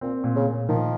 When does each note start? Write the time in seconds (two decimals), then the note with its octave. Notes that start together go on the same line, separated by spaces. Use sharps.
0.01 A#2 C4
0.24 A#2
0.36 C#3
0.47 A#2
0.68 D#3 F3